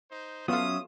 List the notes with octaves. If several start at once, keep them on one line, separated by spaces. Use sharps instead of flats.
D#4 C5
F#3 B3 C#4 F4 A4 E5 F5 D#6